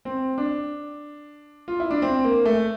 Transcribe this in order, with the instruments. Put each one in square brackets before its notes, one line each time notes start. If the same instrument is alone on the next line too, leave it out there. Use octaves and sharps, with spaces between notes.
[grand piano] C4
D4
F4
E4
D4
C4
A#3
A3